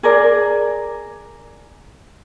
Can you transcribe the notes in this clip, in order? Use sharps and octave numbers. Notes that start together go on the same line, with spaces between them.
G#4 A#4 D5